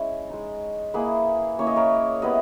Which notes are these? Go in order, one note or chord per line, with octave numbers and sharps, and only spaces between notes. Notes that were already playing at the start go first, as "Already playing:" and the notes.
Already playing: G#3 C#4 E4
G#3 D#4
A#3 E4 G#4 B4
A#3 C#4 E4 C#5
D#5
A#4 C#5
G3 B3 E4 B4 D#5